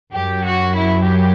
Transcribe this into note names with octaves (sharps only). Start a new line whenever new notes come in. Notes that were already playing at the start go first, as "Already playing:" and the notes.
F#2 F#3 G4
F#4
E4
G4